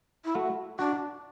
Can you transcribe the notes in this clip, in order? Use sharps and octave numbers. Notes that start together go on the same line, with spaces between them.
E4
A3 F#4
D4 F#4